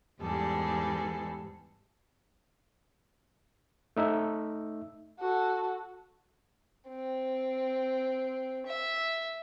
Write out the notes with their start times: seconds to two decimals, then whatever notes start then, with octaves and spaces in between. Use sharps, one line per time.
0.22 E2 G#2 G3 G#4 A4
3.97 A3 D#4 E5
5.20 F#4 A4
6.89 C4
8.66 E5